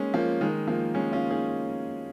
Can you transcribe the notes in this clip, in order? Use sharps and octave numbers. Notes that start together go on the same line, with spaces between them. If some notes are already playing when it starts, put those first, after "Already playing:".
Already playing: G#3 A#3 C#4 D#4
F3 A#3
D#3 G#3
F3 A#3
G#3 C#4
C#4 F4
D#4 G#4